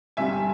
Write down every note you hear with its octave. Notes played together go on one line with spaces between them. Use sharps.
G1 G2 G3 E5 G#5